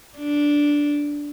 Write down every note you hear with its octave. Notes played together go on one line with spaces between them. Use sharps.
D4